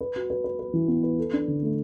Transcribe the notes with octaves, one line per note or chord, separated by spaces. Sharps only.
B4
F#4
B4
B4
B4
E3
B3
B4
A4
D4
D3
A3